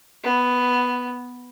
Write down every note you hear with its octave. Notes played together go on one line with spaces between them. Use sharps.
B3